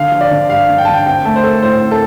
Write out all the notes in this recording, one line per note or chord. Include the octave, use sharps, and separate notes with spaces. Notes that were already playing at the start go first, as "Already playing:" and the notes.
Already playing: D3 F5
F3
D5
D3
G2 F5
D3
G5
A5
D3
G5
C4 G5
A3 A5
C5
A3 A4
A2 C5
C4
A4